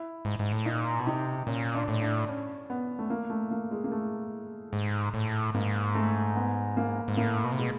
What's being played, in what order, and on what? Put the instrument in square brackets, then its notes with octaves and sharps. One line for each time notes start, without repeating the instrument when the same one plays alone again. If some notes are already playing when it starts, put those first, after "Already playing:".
Already playing: [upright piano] E4
[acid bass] G#2
G#2
A2
[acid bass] A#2 [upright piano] D#4
[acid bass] B2
[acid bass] C3 [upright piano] D#4
[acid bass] A#2 [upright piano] C#4
[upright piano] D4
[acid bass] A2
[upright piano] D4
C#4
B3
A3
A#3
A3
A#3
G#3
A#3
A3
[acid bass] G#2
A2
[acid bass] G#2 [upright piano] A#3
[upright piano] A3
B3
A#3
[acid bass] G#2
[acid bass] A2 [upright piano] A#3
[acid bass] B2
C3
[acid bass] B2 [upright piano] G#3